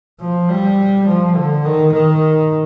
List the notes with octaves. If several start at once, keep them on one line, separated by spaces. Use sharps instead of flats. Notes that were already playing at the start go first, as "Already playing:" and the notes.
F3
G3
F3
D3
D#3
D#3